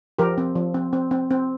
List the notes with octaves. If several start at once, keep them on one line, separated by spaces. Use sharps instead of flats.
F3 G4 A#4
C4
F3
C4
C4
C4
C4